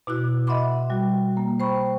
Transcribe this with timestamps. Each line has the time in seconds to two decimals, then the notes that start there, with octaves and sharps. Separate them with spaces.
0.07 B2 E4 F#4 F#6
0.47 D#5 E5 F#5 B5 C6 D6
0.90 G3 F#4
1.37 A#3
1.60 C5 G5 B5 C#6